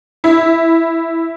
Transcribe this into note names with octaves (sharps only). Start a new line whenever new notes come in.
E4